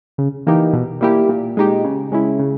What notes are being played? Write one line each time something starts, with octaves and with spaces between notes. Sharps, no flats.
C#3
E3 A#3 D#4 G4
B2
G3 A#3 E4 G4
A#2
G#3 D#4 G4
C#3
G#3 C#4 E4
C#3